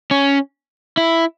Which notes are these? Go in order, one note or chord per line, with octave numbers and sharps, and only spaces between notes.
C#4
E4